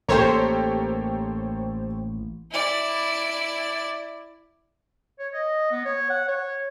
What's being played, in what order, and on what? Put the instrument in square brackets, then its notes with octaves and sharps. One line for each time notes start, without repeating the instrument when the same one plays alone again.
[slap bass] A1 A#3 [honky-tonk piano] G4 A4 A#4 [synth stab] C5 C#5
[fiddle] E4 D5
[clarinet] C#5
D#5
B3
C#5
F#5
C#5